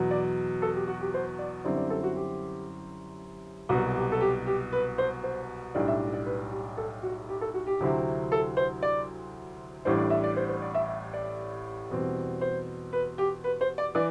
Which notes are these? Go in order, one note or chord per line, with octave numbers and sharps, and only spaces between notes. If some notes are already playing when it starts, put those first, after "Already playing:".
Already playing: E2 B2 F#3
D5
A4
G4
F#4
G4
C5
D5
F#2 D3 G3 C4 E4 D5
D5
A4
F#4
G4
C2 B2 F#3 F#4
G4
A4
G4
G4
B4
C5
C5
B1 A2 G3 D4 D5
E5
D5
B4
G4
A4
F#4
G4
A4
F#4
G4
D2 C3 F#3 C4 E4
A4
C5
D5
A1 A2 G3 D4 C5
D5
E5
D5
C5
C5
D5
E5
E5
D5
E2 B2 G3 C4
C5
B4
G4
B4
C5
D5
E3 D5